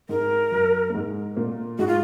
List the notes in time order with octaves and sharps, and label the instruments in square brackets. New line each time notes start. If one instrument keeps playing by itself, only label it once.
[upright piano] G#2 G#3 [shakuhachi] A#4
[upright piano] F#2 F#3
A#3
G#2 G#3
A#2 A#3
[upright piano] G#2 G#3 [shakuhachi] F#4
[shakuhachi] F4